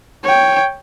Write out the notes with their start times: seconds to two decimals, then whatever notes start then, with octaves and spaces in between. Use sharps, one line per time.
0.23 C#5 G5